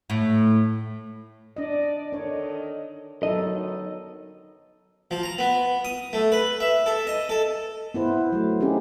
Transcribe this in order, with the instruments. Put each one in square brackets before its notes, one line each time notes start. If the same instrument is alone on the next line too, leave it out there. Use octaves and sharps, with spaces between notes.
[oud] A2
[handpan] D4 D#5 [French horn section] D5
[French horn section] D#3 A4 D#5 [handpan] D4 C#5
[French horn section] D3 D#3 B3 [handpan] F#3 D#4 A4 [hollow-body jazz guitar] D#5
[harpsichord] F3
A#5
B3
D#6
A3
B4
E5
A4
D#5
A4
[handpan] B3 E4 B4 C5
F#3 A3
C4 C#4 D#4 G4 G#4